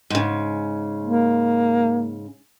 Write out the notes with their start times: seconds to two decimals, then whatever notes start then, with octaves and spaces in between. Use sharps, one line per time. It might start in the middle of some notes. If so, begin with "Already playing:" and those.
0.10 G#2 C#3
1.03 A#3